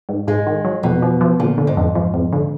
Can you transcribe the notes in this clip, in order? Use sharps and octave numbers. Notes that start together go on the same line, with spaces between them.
G#2
G#2 G#3
D#3
F#3
F2 B2
F3
F3
A#2 D3
D3
G#2
F2
F3
F2
D3